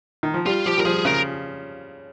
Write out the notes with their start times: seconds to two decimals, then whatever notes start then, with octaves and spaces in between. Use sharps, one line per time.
0.23 D#3
0.34 F3
0.46 G3 F4
0.66 F3 G4
0.78 G3 A#4
0.85 F3 G#4
1.05 C#3 A#4